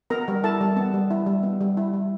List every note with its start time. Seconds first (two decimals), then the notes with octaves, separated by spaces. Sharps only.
0.10 B3 A#4 A#5
0.28 G3
0.44 E4 A4 A5
0.61 G3
0.77 B3
0.94 G3
1.11 E4
1.26 G3
1.43 B3
1.61 G3
1.77 E4
1.93 G3